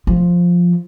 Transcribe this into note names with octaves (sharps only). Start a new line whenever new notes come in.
F3